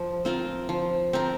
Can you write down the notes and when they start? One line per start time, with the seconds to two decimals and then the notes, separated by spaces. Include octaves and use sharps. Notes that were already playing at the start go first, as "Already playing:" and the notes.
Already playing: F3
0.25 C4 F4 A#4
0.69 F3
1.13 C4 F4 A#4